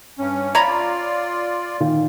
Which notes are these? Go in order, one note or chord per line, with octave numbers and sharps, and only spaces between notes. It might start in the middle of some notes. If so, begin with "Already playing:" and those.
G2 C#4
F4 C#5 D5 A#5 B5
A#2 D#3 F4